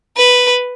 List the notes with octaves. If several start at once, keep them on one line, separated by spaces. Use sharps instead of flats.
B4